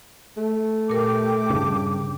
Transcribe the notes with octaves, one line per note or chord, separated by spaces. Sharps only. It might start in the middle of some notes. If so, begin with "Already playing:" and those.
A3
A#2 G4 A#4 D6
G2 C#3